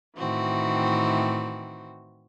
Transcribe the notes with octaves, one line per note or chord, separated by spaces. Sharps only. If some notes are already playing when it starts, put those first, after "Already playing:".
A2 D#3 E3 C4 F#4